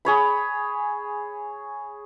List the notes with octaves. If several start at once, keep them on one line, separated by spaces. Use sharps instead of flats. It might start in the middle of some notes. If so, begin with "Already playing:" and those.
G#4 C#5 B5